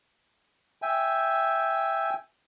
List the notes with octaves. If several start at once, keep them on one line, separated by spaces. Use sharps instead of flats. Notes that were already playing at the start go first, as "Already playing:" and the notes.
E5 G5 G#5